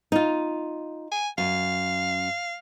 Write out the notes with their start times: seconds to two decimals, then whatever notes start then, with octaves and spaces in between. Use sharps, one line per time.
0.12 D#4 F4
1.12 G#5
1.38 F#2 F5